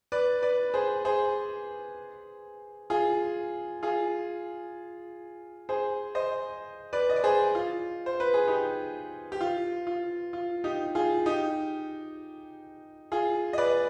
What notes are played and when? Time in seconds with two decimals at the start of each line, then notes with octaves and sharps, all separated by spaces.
0.12 B4 D5
0.42 B4 D5
0.74 G#4 C5
1.05 G#4 C5
2.90 F4 G#4
3.83 F4 G#4
5.69 G#4 C5
6.15 C5 D#5
6.93 B4 D5
7.10 D#5
7.16 D5
7.24 G#4 C5
7.55 F4
8.06 C5
8.20 B4
8.34 G#4
8.48 D#4 G4
9.32 G4
9.41 F4
9.87 F4
10.33 F4
10.64 D#4 G4
10.95 F4 G#4
11.26 D#4 G4
13.12 F4 G#4
13.53 D#5
13.58 B4 D5